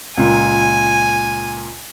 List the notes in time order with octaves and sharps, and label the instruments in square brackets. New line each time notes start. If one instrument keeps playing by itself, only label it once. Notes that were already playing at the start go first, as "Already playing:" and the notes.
[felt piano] C#2 A#2 [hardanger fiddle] G#5